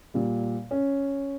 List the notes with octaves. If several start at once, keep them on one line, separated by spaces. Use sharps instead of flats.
A#2 G3
C#4